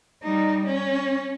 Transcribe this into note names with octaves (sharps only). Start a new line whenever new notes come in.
G3 D#4
C#4